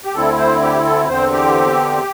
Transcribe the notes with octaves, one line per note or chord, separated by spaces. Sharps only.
G4
D2 D3 C4 E4 A4
C5
G4
A4
E2 D3 C4 C5
G4